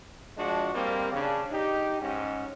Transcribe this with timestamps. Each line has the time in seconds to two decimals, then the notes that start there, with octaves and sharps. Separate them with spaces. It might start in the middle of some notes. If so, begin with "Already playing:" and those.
0.38 F3 G#3 D4 F#4
0.75 G3 A#3 C4
1.13 C#3 D4
1.52 D#4 G4
2.01 G#2 C#4